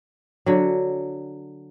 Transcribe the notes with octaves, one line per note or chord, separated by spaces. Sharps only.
D3 F#3